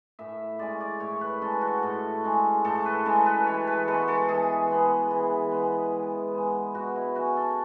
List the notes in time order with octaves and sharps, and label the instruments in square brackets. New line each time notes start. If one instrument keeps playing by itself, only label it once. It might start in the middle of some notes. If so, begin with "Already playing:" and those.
[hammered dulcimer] A2 E5
G#3 C#4 D5
D5
A2 C#5
B4
G#3 C#4 A4
F#4
A2 A4
G#3 C#4
A2 A4
B4
G#3 C#4 A4
B4
E3 C#5
B4
G#3 B3 A4
A4
E3 G#4
G#3 B3
E3
G#3 B3
E3
G#3 B3
B2 F#4
E4
F#3 C#4 F#4
A4